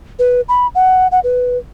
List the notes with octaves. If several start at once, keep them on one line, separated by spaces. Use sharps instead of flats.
B4
B5
F#5
F#5
B4